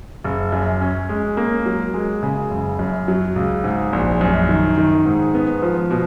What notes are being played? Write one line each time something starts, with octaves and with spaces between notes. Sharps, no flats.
F#1
F#2
C#4
G#3
A#3
F#3
G#3
C#3
F#1
F#2
F#3
C#2
G#2
A#1
F#2
D#3
D#3
G#2
B3
F3
B2